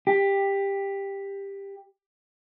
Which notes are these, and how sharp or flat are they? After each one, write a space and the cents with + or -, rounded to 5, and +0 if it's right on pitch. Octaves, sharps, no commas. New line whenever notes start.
G4 +15